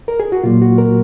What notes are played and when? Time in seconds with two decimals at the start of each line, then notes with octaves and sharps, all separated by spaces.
0.08 A#4
0.20 G#4
0.32 F#4
0.43 A#2 F#3 A#3 F4
0.62 F#4
0.78 A#4